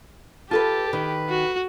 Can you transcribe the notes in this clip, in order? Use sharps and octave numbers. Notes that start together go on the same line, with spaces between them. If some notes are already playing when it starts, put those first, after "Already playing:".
F4 G4 A4 B4 A5
D#3 B4
F#4